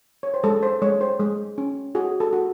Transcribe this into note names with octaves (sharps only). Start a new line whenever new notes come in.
C#5
C5
G#3 A4
C5
G#3 C#5
C5
G#3
C#4
F#4 G#4
A4
F#4